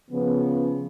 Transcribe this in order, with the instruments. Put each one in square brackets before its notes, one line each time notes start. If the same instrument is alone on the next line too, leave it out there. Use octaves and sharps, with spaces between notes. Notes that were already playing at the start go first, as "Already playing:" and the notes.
[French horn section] C#3 F3 B3